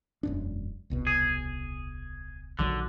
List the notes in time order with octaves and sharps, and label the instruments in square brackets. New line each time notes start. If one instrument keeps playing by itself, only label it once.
[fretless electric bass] E1 F#2 D4
D#1 C2 B2
[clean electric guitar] G#4
[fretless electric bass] A#1 D#3 F#3 [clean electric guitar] D3